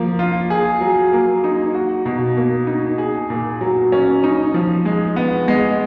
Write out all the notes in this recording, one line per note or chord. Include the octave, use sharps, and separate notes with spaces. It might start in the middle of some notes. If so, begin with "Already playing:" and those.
Already playing: F3 A#3
F4
G#4
F#3
A#3
D#4
F#4
B2
A#3
D#4
G#4
A#2
F#3
C#4
D#4
F3
G#3
B3
G#3